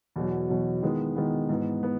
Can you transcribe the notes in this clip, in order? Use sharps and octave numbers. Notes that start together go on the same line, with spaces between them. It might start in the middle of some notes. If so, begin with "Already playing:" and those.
E2 B2 F#3
E2 B2 F#3
D#3 G#3 B3 E4
D#3 G#3 B3 E4
G#2 E3 B3
B3